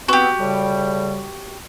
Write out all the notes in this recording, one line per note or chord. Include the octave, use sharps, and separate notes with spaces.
B3 C4 F#4 G4
A2 C#3 G3